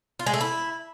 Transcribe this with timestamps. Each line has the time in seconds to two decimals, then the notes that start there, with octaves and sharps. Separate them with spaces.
0.19 F4
0.26 G#3
0.34 A3
0.41 E4